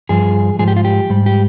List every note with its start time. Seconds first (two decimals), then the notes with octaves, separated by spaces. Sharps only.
0.09 G2 F3 G#4
0.59 G#2 F3 G#4
0.68 G4
0.77 F4
0.85 G4
1.10 G#2 G3
1.26 G4